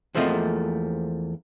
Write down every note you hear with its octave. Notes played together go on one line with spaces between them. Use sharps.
E2 F3 A3 A#3 C4 D#5